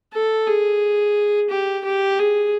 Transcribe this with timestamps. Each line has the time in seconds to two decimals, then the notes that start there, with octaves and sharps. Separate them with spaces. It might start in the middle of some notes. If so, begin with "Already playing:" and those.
0.13 A4
0.47 G#4
1.50 G4
1.85 G4
2.19 G#4